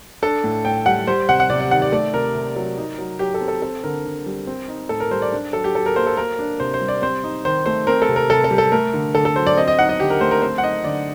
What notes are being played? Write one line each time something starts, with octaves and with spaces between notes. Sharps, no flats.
D4 A4
A2
A2 G5
G3 F#5
G3 C5
C3 F#5
F#5
C3 D5
D5
D#3 F#5
D5
A3 D5
C3 A#4
C3
F#3
D#4
F#3
F#3 G4
A4
C4
A4
C4 A4
D3 A#4
D3
G3
C4
D#4
A2 A4
A#4
G3 C5
D5
D4
F#3 A4
G4
F#3 A4
A#4
A#3 C5
A4
A#3 A#4
D4
C3 C5
C5
G3
D5
C4 C5
D#4
D#3 C5
A3 C5
C4 A#4
A4
C3
A#4
C3 A4
A4
G3
A4
A3 A#4
D3
D3 A4
A4
F#3 C5
D5
C4 D#5
D#5
D#4 F#5
D#5
D3 G4
A#4
A3 C5
A#4
C4 C5
F#5
D#4 D#5
D3 D5